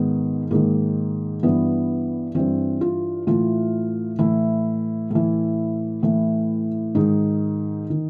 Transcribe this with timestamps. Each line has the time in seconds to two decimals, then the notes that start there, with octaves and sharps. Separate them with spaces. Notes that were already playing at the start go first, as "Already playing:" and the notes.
Already playing: G#2 D#3 B3
0.51 G#2 D#3 A#3
1.43 G2 E3 B3
2.35 G2 E3 C4
2.81 F4
3.27 A2 E3 F4
4.19 A2 E3 E4
5.11 A2 E3
6.03 A2 E3
6.95 G#2 D#3 D#4
7.90 D#3